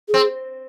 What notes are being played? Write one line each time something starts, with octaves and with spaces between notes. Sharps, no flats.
G#4
C4